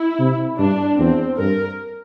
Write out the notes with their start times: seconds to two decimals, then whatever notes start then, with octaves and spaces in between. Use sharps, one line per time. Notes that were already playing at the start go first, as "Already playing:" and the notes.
Already playing: E4
0.19 C3
0.58 G2 D4
0.99 E2 C4
1.39 G2 A#4